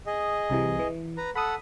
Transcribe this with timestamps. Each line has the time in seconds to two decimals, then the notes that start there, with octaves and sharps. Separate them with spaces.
0.06 G#4 D#5
0.50 C2 C3 E3
0.79 E3
1.17 B4 A#5
1.36 A4 F#5 B5 D#6